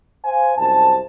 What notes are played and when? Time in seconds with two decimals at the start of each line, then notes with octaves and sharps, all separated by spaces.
0.25 C5 F5 G#5
0.57 C2 F#2 C5 A5